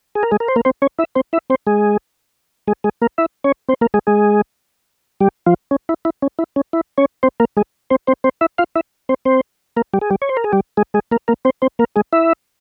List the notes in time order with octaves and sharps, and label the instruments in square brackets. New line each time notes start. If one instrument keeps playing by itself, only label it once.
[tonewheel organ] G#4
A#4
G#3 G#4
A#4
C5
A#3 A#4
C4 C5
C#4 C#5
E4 E5
C4 C5
E4 E5
C4 C5
G#3 G#4
G#3 G#4
G#3 G#4
A#3 A#4
E4 E5
C#4 C#5
C4 C5
A#3 A#4
G#3 G#4
G#3 G#4
G3 G4
F3 F4
C#4
E4
E4
C#4
E4
C#4
E4
C#4 C#5
C4 C5
A#3 A#4
G#3 G#4
C4 C5
C4 C5
C4 C5
E4 E5
F4 F5
E4 E5
C4 C5
C4 C5
A#3 A#4
G3 G4
G#4
G3 G4
C#5
C5
A#4
G#4
G3 G4
G#3 G#4
G#3 G#4
A#3 A#4
A#3 A#4
C4 C5
C4 C5
A#3 A#4
G#3 G#4
E4 E5